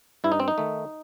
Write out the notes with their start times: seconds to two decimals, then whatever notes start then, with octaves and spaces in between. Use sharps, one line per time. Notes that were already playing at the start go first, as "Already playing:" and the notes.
0.24 G2 E4
0.32 D#4
0.40 C4
0.48 D#4
0.58 D#3 A3